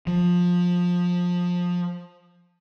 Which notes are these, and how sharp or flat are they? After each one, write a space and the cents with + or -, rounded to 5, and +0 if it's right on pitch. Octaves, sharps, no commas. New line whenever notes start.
F3 +20